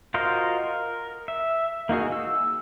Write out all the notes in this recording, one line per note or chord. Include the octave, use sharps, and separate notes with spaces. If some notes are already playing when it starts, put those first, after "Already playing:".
F4 F#4 A#4 C5 D#5
A#4
E5
A#3 D#4 F#4 G#4
E6